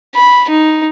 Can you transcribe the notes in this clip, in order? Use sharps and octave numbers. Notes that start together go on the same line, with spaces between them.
B5
D#4